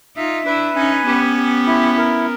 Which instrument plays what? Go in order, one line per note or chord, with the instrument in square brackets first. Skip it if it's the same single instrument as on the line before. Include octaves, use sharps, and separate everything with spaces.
[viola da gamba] D#4 F4 [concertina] E5
[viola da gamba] D4 E4 [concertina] B4
[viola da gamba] C#4 D#4 [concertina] G#5
[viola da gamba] B3 C#4 [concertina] G4
[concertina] G4
E4
A#4